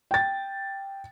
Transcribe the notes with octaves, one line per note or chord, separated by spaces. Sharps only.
G5 A6